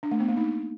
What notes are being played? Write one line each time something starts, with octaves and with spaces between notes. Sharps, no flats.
D4
A3
B3
A#3
D#4